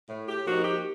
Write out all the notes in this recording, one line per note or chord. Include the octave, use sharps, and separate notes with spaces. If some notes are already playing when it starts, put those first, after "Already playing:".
A2
G4
F3 A#3 D#4 F#4
G4